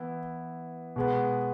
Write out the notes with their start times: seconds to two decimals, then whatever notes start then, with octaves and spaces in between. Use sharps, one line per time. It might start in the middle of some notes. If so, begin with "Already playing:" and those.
Already playing: E3 B3 E4
0.96 B2 G#3 B3